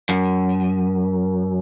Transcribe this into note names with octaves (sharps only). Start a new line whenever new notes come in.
F#2